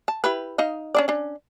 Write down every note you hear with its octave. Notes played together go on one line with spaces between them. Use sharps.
A5
E4 G4 B4
D#4 D#5 F5
C#4 D4 D5
C#4 D4